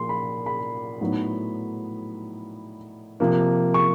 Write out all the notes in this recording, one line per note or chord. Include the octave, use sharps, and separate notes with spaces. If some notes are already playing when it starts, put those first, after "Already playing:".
Already playing: A#2 F3 A#3 C6
B5
B5
A2 F#3 B3 D#4
C3 F3 A#3
C#6